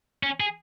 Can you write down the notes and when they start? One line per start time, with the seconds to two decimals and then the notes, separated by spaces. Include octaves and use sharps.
0.23 C#4
0.40 G#4